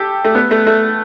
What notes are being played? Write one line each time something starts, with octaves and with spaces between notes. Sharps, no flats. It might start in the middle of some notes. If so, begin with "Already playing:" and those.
Already playing: G4 A4
A3
B3
A3
A3